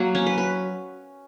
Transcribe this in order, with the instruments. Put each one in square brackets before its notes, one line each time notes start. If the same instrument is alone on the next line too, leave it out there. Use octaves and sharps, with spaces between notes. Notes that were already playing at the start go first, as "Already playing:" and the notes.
Already playing: [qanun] F#3 A#3
C#4
B4
B4